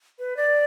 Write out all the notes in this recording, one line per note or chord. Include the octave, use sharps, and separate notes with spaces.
B4
D5